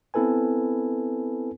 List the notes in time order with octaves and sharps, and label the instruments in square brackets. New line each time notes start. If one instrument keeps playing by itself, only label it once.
[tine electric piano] B3 C4 E4 A4 B4 G#5